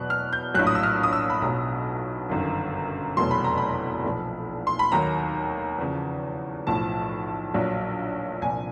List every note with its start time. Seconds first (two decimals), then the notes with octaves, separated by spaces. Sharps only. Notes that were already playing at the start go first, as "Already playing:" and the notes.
Already playing: E2 B2 F#3 F#6
0.10 F6
0.33 G6
0.54 A#1 A2 F#3 F#6
0.67 D#6
0.75 E6
0.83 F6
1.03 D#6
1.13 E6
1.30 B5
1.42 B1 B2 F#3 A#5
2.29 G1 F#2 D#3
3.17 F1 E2 B2 F#3 C6
3.31 B5
3.44 A#5
3.58 B5
4.04 B1 A#2 F3
4.67 C6
4.79 B5
4.92 D#2 D#3 F#3 A#5
5.79 E2 C#3 F3
6.67 B1 A2 F3 A5
7.54 A#1 A#2 F#3
8.42 C2 A#2 F3 G#5